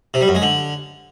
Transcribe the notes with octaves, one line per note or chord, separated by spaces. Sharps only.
C3
G3
F#2
G#3
D3